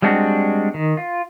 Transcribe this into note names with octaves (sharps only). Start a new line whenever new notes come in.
G3 G#3 C4 D4 F#4
D#3
F4